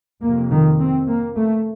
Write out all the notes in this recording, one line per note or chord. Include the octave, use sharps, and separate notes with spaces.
F2 C3 A#3
D#3
C4
A#3
A3